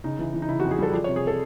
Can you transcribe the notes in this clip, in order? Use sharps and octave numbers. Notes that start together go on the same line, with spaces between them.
C#3 D#4
E3
E3
D#4
C#3 E4
F#4
F2
G#4
G3 A4
F3 D5
C#5
C3
G#4
A4